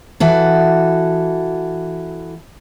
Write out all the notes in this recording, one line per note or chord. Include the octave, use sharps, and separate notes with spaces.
E3 F#4 A4